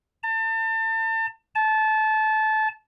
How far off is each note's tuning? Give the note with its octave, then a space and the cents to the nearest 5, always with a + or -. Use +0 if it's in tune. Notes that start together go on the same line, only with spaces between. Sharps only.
A5 +35
A5 -20